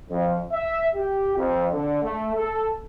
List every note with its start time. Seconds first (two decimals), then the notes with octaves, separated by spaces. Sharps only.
0.10 F2
0.52 E5
0.95 G4
1.37 F2
1.72 D3
2.03 A3
2.34 A4